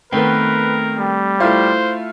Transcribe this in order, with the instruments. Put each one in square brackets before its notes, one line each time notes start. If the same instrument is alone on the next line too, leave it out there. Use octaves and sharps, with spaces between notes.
[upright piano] D#3 B3 [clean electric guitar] A3 C4 [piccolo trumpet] A#4 [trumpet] B4
[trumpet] G3
[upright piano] A3 E4 F4 [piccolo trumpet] C5